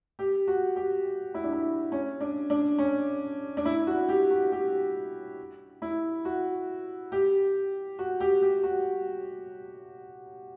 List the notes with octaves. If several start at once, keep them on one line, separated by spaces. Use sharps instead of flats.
G4
F#4
G4
E4
D4
E4
C#4
D4
D4
C#4
D4
E4
F#4
G4
F#4
G4
E4
F#4
G4
F#4
G4
G4
F#4